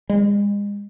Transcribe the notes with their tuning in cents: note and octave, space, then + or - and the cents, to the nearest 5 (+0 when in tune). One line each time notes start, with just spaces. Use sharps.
G#3 -35